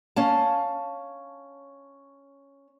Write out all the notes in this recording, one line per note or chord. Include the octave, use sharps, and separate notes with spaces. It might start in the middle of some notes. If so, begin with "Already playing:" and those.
C#4 F5 A5